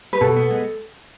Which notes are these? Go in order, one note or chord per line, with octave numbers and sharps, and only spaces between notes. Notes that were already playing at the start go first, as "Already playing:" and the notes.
B4
B2 A4
B3
G#3